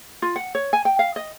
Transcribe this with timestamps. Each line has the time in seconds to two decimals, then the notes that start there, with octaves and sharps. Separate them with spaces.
0.22 F4
0.36 F#5
0.55 C#5
0.73 G#5
0.85 G5
0.99 F5
1.16 D#5